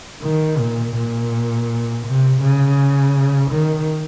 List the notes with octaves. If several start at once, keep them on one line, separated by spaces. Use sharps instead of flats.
D#3
A#2
A#2
C3
C#3
D#3